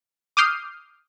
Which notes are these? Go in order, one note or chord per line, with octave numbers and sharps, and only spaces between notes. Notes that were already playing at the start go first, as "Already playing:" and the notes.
D6 D#6 F6 G6 C7 D#7